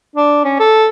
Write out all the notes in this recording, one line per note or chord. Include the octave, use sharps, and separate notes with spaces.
D4
C#4
A4